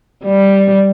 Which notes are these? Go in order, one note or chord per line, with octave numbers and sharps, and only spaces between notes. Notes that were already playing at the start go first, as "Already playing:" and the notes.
G3